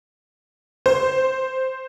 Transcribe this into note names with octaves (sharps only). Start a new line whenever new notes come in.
C5